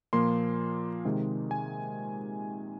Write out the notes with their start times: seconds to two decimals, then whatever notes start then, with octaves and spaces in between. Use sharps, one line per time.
0.13 A#2 F3 A#3 C6
1.05 C3 D#3 G#3
1.51 G#5